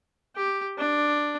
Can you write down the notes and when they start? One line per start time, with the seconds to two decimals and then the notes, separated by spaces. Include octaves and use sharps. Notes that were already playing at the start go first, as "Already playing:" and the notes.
0.36 G4
0.78 D4